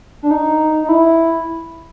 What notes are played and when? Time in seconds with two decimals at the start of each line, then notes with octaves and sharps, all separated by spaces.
0.23 D4
0.31 D#4
0.83 D#4
0.89 E4